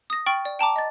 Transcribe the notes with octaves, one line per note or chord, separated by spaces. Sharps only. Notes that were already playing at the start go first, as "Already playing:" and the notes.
D#6 A#6
G5 C#6 F6 A6 D7 F#7
D5
G5 A5 A#5 D6
D#5 A6